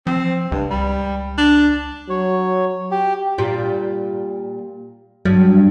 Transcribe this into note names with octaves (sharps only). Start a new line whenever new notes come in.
F3 C4
C#2 G2
G3
D4
F#3 C#5
G4
A#2 G3 F4
G2 F#3